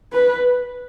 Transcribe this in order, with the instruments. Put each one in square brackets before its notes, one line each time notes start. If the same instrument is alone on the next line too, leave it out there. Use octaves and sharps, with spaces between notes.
[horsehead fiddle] B4